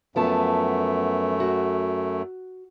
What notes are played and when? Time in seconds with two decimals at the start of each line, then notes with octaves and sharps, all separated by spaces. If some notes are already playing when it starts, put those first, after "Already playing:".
0.16 F#2 F3 A3 B3 A5
1.40 F#4